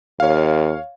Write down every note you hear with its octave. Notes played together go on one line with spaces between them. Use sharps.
D#2 C#5 F5